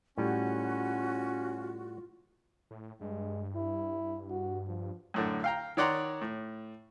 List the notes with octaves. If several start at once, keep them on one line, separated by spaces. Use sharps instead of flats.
A2 G3 C#4 F4 F#4
A2
G2 G#3
E4
F#4
F3
F#2 A2 D3
F5 G5 A#5
D#3 C#5 D5 F#5 A#5 C6
A2